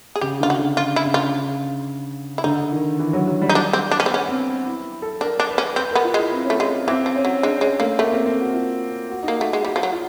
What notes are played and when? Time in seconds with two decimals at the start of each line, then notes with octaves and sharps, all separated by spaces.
0.16 G#4
0.21 C#3 G4
0.40 D3 F4
0.50 F#4
0.59 D3
0.77 D3 F4
0.96 E4
1.05 C#3
1.14 F4
2.38 E4
2.44 D3 D#4
2.72 D#3
2.99 E3
3.13 F#3
3.27 F#3
3.42 G3
3.49 D#4
3.55 D4
3.73 C4
3.91 D4
4.00 C#4
4.06 C4
4.10 B3 C#4
4.29 C4
4.66 E4
5.02 A4
5.21 D4 A#4
5.40 D4
5.49 B4
5.58 C#4
5.76 C4 B4
5.91 B3 A#4
6.04 F4
6.14 G#3
6.18 E4
6.32 C4
6.45 C#4
6.50 A3
6.57 G#3 C4
6.87 E3 C4
7.06 F3
7.16 C#4
7.25 F#3
7.43 G#3 D4
7.61 G#3 C#4
7.80 A3 A#3
7.98 A3 A#3
8.12 C4
8.26 C4
8.40 F#4
8.54 F4
9.10 F#4
9.23 D#4
9.28 A#3
9.37 A3 F#4
9.51 G#3 F#4
9.65 G3 F#4
9.76 F3
9.83 F#3
9.92 F4